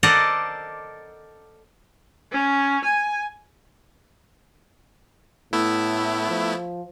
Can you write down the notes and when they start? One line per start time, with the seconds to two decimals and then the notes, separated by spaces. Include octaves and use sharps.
0.03 A4 A#4 C5 D5 D#5 F#5
2.32 C#4
2.84 G#5
5.53 A2 A3 B3 E4
6.30 F3